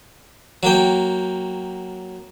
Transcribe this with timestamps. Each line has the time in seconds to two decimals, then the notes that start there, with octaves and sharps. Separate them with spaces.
0.63 F#3 A#3 G5